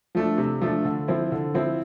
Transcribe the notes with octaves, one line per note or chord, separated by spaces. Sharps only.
F3 A3 D4
C3
F3 A3 D4
D3
F3 C4 E4
D3
F3 C4 E4